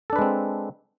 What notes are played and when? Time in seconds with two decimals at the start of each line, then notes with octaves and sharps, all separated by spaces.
0.10 A4
0.13 D4
0.16 B4
0.19 G#3
0.22 C4